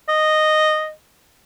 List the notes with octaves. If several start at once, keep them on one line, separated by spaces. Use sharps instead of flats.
D#5